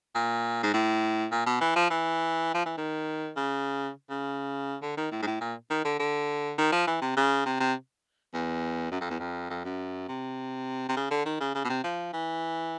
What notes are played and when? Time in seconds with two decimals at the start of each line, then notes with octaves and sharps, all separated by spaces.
0.15 A#2
0.63 G#2
0.74 A2
1.32 A#2
1.46 B2
1.61 E3
1.76 F3
1.90 E3
2.54 F3
2.66 E3
2.78 D#3
3.37 C#3
4.10 C#3
4.82 D3
4.97 D#3
5.12 A2
5.22 G#2
5.26 A2
5.41 A#2
5.70 D#3
5.85 D3
6.00 D3
6.58 D#3
6.72 F3
6.87 E3
7.02 C3
7.16 C#3
7.46 C3
7.60 C3
8.33 E2
8.91 F#2
9.01 F2
9.10 E2
9.19 F2
9.50 F2
9.65 F#2
10.09 C3
10.89 C3
10.96 C#3
11.11 D3
11.25 D#3
11.40 C#3
11.55 C#3
11.64 B2
11.70 C3
11.84 F3
12.13 E3